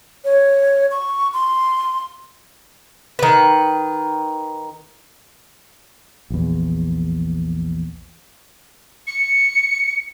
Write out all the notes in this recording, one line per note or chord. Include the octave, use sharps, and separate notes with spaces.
C#5
C#6
C6
D#3 B4
A#1 E2
C#7